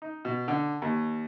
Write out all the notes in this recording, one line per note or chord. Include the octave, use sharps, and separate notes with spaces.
D#4
B2
D3
D#2